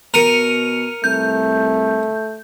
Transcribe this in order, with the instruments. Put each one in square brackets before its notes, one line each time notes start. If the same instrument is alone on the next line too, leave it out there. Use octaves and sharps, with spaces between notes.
[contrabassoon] B2 [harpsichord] A#4 [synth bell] C#7 D#7 F7
[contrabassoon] C2 [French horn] A3 [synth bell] G6